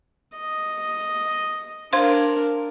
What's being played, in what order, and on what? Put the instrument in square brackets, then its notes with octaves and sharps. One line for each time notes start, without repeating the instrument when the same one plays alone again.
[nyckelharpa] D#5
[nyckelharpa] D4 A#4 [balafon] C5 F5 C6